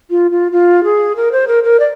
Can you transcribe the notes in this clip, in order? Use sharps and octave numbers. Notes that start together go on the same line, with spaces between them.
F4
F4
F4
G#4
A#4
C5
A#4
A#4
D5